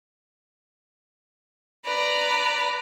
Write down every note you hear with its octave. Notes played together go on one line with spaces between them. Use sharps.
B4 D5 A#5